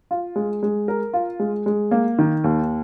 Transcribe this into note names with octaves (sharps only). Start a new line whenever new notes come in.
F4
G#3
G#3
A#4
F4
G#3
G#3
A#3
D#3
D#2